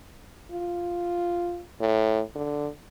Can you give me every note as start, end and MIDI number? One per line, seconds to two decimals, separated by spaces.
0.52 1.63 65
1.81 2.21 45
2.35 2.68 50